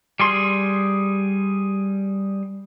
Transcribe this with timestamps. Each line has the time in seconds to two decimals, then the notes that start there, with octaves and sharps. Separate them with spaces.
0.20 G3 G#4 C6